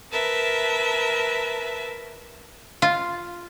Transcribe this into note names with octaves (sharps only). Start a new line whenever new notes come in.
A#4 B4 E5 A5
F4